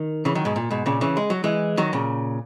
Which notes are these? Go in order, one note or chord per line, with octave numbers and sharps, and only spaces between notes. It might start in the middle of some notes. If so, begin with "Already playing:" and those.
Already playing: D#3
C#3 E3
D#3 F#3
G#2 B2
A#2
G#2 B2
A#2 C#3
C#3 E3
G#3
F#3
E3 G#3
D#3 F#3
A#2 C#3